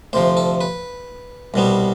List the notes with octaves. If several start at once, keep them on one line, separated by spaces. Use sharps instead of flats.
D2 C3 F3 C5
A4
B4
C2 B2 G3 B3